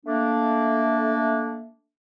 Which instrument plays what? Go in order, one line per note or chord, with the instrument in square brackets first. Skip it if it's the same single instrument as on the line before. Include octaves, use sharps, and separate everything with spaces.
[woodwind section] A3 A#3 D4